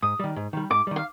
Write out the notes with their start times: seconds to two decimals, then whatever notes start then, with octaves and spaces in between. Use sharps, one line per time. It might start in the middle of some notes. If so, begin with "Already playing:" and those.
0.02 G#2 D#6
0.19 D#3 G3
0.36 G#2
0.53 D#3 G3
0.70 G#2 D6
0.87 D#3 G3
0.96 F5